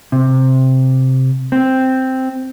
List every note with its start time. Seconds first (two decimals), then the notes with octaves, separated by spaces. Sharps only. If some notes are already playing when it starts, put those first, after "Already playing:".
0.12 C3
1.52 C4